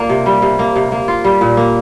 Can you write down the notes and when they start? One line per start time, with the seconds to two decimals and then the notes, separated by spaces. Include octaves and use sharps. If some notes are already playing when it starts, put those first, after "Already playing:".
Already playing: A#3 D4 F4
0.09 C3
0.26 G3
0.42 C3
0.59 A#3
0.76 C3
0.92 A#3
1.08 F4
1.24 G3
1.41 A#2
1.57 A#3